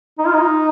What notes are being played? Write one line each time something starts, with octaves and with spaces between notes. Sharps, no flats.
D#4
F4
D#4